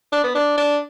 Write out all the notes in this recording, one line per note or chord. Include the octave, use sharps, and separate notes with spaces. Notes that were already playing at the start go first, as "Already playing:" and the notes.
D4
B3
D4
D4